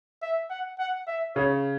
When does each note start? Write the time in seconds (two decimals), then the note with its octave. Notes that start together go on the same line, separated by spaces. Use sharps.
0.22 E5
0.50 F#5
0.79 F#5
1.07 E5
1.36 C#3 C#5